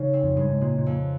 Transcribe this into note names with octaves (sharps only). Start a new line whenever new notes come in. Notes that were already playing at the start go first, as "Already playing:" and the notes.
Already playing: C#3 D#4
C4
F2
G2 G#3
G#2
A#2 G#3
A#2
F2